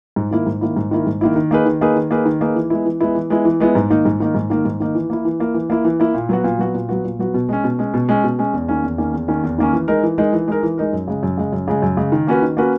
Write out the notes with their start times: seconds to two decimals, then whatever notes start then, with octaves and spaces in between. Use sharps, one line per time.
0.16 G#2
0.31 D#3 A#3 E4
0.46 G#2
0.61 D#3 A#3 E4
0.77 G#2
0.91 D#3 A#3 E4
1.07 G#2
1.21 D#3 A#3 E4
1.36 D#3
1.51 A#3 D#4 G#4 B4
1.66 D#3
1.81 A#3 D#4 G#4 B4
1.96 D#3
2.11 A#3 D#4 G#4 B4
2.26 D#3
2.41 A#3 D#4 G#4 B4
2.56 E3
2.70 G#3 B3 E4
2.86 E3
3.00 G#3 B3 E4
3.15 E3
3.30 G#3 B3 E4
3.45 E3
3.60 G#3 B3 E4
3.75 G#2
3.90 D#3 A#3 D#4
4.05 G#2
4.20 D#3 A#3 D#4
4.35 G#2
4.50 D#3 A#3 D#4
4.65 G#2
4.80 D#3 A#3 D#4
4.95 E3
5.10 A#3 E4
5.25 E3
5.40 A#3 E4
5.54 E3
5.70 A#3 E4
5.85 E3
6.00 A#3 E4
6.14 A#2
6.29 F#3 B3 F#4
6.44 A#2
6.59 F#3 B3 F#4
6.74 A#2
6.89 F#3 B3 F#4
7.04 A#2
7.19 F#3 B3 F#4
7.34 B2
7.49 G#3 C#4
7.64 B2
7.79 G#3 C#4
7.94 B2
8.09 G#3 C#4
8.23 B2
8.39 G#3 C#4
8.53 E2
8.68 D#3 A#3 C#4
8.83 E2
8.98 D#3 A#3 C#4
9.13 E2
9.28 D#3 A#3 C#4
9.43 E2
9.58 D#3 A#3 C#4
9.73 E3
9.88 G#3 D#4 A#4
10.03 E3
10.18 G#3 D#4 A#4
10.33 E3
10.48 G#3 D#4 A#4
10.63 E3
10.78 G#3 D#4 A#4
10.93 F#2
11.08 C#3 G#3
11.23 F#2
11.37 C#3 G#3
11.53 F#2
11.67 C#3 G#3
11.82 F#2
11.97 C#3 G#3
12.12 D#3
12.27 A#3 C#4 F#4 B4
12.42 D#3
12.57 A#3 C#4 F#4 B4